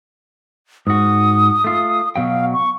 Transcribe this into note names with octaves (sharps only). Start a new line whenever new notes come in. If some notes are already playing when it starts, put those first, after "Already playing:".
G#2 F#4 D#6
A3 F4
B2 F#3 F5 G5
C#6